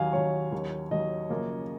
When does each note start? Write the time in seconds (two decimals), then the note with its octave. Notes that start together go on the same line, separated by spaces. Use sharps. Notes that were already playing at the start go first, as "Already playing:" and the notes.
Already playing: D#2 D#3 F#3 F5 G#5
0.13 D#2 D#3 F#3 C#5
0.52 D#2 D#3 F#3
0.91 D#2 D#3 F#3 D#5
1.29 F#2 C#3 F3 A#3 F4